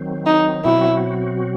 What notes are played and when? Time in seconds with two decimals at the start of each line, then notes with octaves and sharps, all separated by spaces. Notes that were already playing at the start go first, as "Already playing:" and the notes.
Already playing: D#3 F#3 C4
0.26 D#4
0.65 B2 F#3 C4 E4 F#4